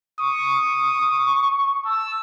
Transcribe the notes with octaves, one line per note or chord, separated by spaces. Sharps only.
C#6 D#6
A5 E6